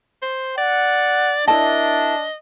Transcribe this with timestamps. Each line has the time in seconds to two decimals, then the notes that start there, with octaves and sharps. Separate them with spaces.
0.22 C5
0.58 D5 F#5
1.48 D4 E4 A#4 D#5 A5